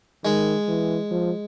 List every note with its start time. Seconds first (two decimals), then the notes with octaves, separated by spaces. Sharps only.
0.24 D#3 G#3
0.68 E3
1.11 F3